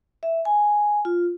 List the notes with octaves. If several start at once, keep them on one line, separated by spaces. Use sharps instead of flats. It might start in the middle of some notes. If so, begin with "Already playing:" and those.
E5
G#5
F4